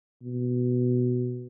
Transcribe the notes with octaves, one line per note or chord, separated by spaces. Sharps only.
B2